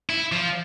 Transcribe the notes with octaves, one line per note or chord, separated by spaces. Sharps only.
E4
F3